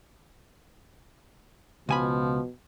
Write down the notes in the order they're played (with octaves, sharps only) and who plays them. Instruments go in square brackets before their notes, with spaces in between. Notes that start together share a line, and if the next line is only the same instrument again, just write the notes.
[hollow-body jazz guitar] C#2 G#5 B5 [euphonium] B2 [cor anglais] F3